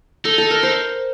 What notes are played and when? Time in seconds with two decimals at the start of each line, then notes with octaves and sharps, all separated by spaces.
0.25 D#4 A4
0.38 A4
0.50 A#4
0.63 C5